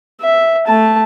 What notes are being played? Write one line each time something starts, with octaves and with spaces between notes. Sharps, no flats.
E5
A3 A5